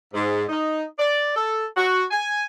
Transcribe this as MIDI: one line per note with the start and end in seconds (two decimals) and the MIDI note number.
0.14 0.44 44
0.48 0.83 63
0.99 1.34 74
1.36 1.65 69
1.77 2.03 66
2.11 2.45 80